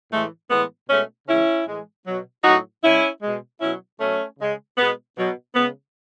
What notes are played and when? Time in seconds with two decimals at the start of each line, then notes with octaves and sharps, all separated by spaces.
0.11 A2 E3 G#3 A3
0.50 A2 E3 G#3 B3
0.88 B2 G#3 A3 C#4
1.27 C#3 E3 G#3 C#4 E4
1.66 A2 E3 G#3
2.05 B2 F#3
2.44 A2 F#3 D#4 F#4
2.83 C#3 G#3 C#4 E4
3.22 B2 G#3
3.60 B2 F#3 C#4 E4
4.00 B2 F#3 A3 C#4
4.39 C#3 G#3
4.77 B2 G#3 B3
5.17 B2 F#3
5.55 C#3 G#3 B3